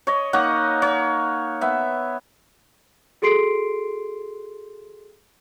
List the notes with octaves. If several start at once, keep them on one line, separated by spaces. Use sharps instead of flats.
C#5 D#5
A#3 D#4 C#5 F#5
C#5
B3 E5
F#4 G#4 A4 C6 C7 D7